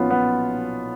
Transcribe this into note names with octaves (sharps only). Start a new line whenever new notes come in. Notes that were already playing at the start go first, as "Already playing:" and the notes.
Already playing: B1 A#2 F3 B3 C#4 F4
B3